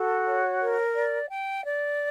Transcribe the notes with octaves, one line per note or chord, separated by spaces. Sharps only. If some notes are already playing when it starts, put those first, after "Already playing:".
Already playing: F#4 A4
C#5
A#4
D5
G5
D5